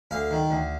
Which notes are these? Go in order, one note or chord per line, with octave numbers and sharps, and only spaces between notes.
D2 F5
D#3
D2